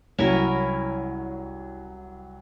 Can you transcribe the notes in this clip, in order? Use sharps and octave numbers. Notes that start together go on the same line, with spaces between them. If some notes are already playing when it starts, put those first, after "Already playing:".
C2 F#3 C#4 E4 A#4